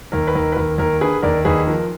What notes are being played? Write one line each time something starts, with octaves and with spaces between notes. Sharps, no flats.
D#2 A#4
B4
D#2 A#4
B4
D#2 A#4
D#2 A#4
D3 G#4 B4
D#2 A#4 D5
D#2 G#4 B4
F3 A#4